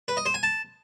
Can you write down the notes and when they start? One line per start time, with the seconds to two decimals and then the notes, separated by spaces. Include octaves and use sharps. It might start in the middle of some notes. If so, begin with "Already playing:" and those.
0.08 B4
0.17 D#5
0.26 C5
0.34 G#5
0.43 A5